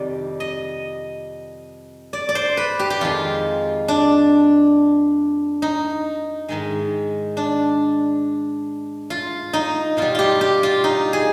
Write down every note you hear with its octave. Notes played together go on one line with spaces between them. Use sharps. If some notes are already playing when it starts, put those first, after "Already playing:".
Already playing: F2 C3 D#3 G3 D5
D#5
D5
D5
C5
B4
G4
G4
F2 D#3 G#3 F4
D4
D#4
G#2 D#3 G#3
D4
F4
D#4
B2 G3 F4
F4 G4
G4
F4
D#4
G#4